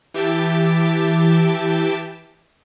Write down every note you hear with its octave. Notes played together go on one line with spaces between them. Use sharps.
E3 G4 E5 G5 A5 D6